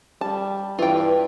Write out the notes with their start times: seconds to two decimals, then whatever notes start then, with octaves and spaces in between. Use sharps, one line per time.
0.21 G3 A5
0.79 G2 E3 F4 G5